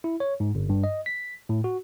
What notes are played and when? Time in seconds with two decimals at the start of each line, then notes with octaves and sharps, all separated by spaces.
0.04 E4
0.20 C#5
0.40 G#2
0.55 G1
0.69 G2
0.84 D#5
1.06 B6
1.49 A2
1.64 F#4